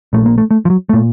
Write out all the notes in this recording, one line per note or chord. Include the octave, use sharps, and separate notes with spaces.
A#1 A#2 A3
A#3
A3
A3
F3
F#3
A#2 A3